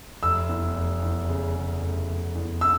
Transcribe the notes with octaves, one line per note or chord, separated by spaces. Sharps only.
F1 E6
E2
F1
E2
C#3
C#3
F1
F1
E2
E6